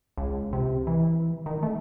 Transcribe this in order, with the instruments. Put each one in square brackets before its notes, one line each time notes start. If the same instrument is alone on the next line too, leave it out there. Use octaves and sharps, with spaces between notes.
[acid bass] C#2
C3
E3
D#3
A3